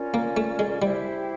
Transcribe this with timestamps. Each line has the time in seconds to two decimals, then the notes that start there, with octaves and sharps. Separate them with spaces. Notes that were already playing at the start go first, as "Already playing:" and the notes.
Already playing: C#4 F4 A#4 D5
0.14 A#3
0.37 A3
0.59 G#3
0.81 G3 E4 G4 C5 E5